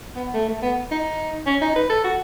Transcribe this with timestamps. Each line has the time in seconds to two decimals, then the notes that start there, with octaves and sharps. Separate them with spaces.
0.15 B3
0.34 A3
0.48 A3
0.62 B3
0.91 D#4
1.46 C#4
1.61 D#4
1.76 B4
1.90 A4
2.04 F#4